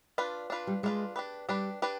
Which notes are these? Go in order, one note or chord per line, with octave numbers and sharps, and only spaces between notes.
D4 F4 B4
D4 F4 B4
G3
G#3 D4 F4 B4
D4 G4 B4
G3 D4 G4 B4
D4 G4 B4